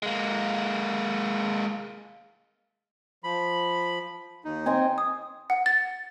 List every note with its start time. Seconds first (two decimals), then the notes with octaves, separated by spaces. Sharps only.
0.03 G#3 A#3
3.24 F3 B5
4.44 D#2 D#4
4.66 C4 D#5 G#5
4.98 D#6
5.50 F#5
5.66 A6